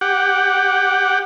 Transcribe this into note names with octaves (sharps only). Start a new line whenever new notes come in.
G4 F#5